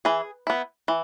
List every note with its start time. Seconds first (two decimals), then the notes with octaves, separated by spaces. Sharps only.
0.05 E3 G#4
0.47 B3 E4
0.88 E3